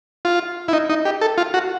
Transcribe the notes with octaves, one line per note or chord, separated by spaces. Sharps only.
F4
E4
D#4
D#4
G4
A4
F4
F#4